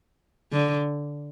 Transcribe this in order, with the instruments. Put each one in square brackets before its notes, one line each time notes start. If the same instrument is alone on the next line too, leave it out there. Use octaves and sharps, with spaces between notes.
[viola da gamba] D3